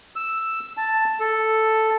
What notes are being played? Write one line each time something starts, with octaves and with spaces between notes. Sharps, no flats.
E6
A5
A4